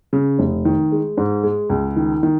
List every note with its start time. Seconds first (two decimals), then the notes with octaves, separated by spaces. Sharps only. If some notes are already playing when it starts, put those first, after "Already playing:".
0.13 C#3
0.39 F1
0.65 D#3
0.92 G#3
1.17 G#2
1.43 G#3
1.70 C#2
1.96 D#3
2.23 D#3